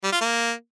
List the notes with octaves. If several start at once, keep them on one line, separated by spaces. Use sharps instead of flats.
G3
F4
A#3